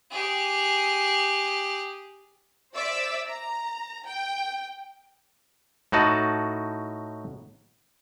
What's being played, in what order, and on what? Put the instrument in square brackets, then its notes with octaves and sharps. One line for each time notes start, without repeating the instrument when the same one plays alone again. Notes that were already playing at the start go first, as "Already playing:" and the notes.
[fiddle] G4 G#4
[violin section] C5 D5 E5 D6 E6
A#5
G5
[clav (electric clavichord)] A2 D#4 F#4 A5